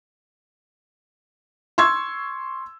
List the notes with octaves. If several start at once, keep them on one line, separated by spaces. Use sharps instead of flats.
C6 C#6 E6 G#6